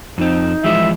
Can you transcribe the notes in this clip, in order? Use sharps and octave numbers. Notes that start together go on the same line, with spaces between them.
F2 C4 D#4
E3 F3 G#3 E5